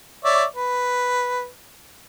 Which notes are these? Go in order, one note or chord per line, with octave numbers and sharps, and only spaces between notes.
C#5 D5 E5
B4